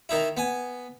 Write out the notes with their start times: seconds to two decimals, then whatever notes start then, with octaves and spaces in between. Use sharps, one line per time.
0.09 D#3 D#4 E4
0.37 B3 G#5